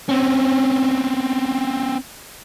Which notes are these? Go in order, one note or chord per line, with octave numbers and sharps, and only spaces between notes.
C4 C#4